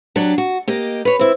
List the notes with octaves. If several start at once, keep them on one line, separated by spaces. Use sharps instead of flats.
F#3 D4 G4
F#4
A#3 G4 D#5
B4 C#5
C4 E4